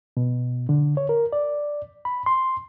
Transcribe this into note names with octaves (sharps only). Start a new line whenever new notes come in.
B2
D3
C#5
A#4
D5
B5
C6